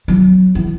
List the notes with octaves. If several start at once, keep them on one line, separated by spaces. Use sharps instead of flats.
F#3
E3